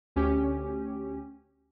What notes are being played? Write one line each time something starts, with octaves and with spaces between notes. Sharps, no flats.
D2 C#4 G4